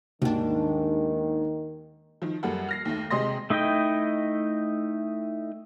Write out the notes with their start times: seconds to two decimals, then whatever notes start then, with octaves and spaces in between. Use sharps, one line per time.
0.22 D#2 G#2 D#3 D4
2.22 D#3 F3
2.43 F#2 G3 A#3 A4 F#5
2.69 F6 A#6 C7
2.85 D#2 A3
3.11 C3 G#3 D#5 C6 A#6
3.50 A3 D#4 E4 D#5 G5